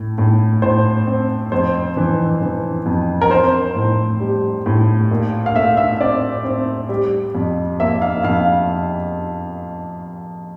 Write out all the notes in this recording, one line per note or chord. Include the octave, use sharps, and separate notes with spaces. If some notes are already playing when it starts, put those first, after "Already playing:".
Already playing: A2
A2
A2 C5
C4
F2 C5
E3
E3
F2
A#4
C4 C5
A2
G3
A2
A#2
F5
A3 E5
E5
C4 D5
C4
G3
F2
A#3 E5
F5
F2 F5